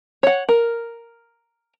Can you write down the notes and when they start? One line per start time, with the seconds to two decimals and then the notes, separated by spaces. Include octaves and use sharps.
0.23 C#5 F#5
0.49 A#4